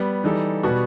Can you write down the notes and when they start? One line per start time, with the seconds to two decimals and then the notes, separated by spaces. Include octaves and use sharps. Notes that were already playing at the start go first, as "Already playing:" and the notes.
Already playing: G3 B3
0.24 E3 G3 D#4 A4
0.63 B2 G3 B3 F#4